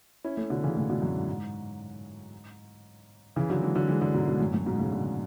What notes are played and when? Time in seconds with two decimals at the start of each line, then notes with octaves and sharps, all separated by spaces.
0.24 C#4 E4
0.37 A3 C#4
0.50 B2 D3
0.63 C#3 E3
0.76 A2 C#3
0.90 B2 D3
1.02 F#2 A2
1.16 G#2
1.28 G#2
3.36 C#3 E3
3.50 D3 F#3
3.62 E3 G#3
3.75 D3 F#3
3.88 E3 G#3
4.02 D3 F#3
4.14 G#2 B2
4.27 G#2 B2
4.40 F#2 A2
4.53 F#2 A2
4.66 G#2 B2
4.79 A2 C#3
4.92 B2 D3